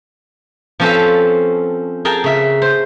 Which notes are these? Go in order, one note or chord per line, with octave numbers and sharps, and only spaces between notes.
F3 C4 C#4 A4 B4 F5
G#4 A#4 G5 A5
C#3 E5
C5